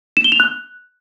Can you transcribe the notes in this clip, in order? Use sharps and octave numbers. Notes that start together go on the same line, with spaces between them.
E7
G7
F7
F#6